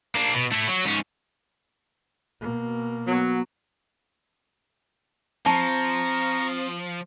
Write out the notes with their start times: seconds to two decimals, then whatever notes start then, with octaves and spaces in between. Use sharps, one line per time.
0.15 A#3 D4
0.34 B2
0.52 A3 E4
0.68 F#3
0.85 G#2 C#4
2.41 B2 A#3
3.07 F#3 B3
5.46 F3 C4 A5 A#5 C#6